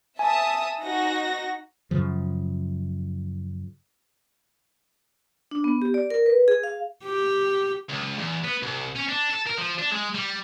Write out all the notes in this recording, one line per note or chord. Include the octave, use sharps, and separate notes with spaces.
E5 G#5 A5 D#6
D#4 F#4 A#6
F#2 C#3 F3
D4
B3
G4
D5
A#4
B4
G#4
F5
G4
C#2
E2
B3
C2
C#4
D4
A4
A#4
F3
D4
G#3
G3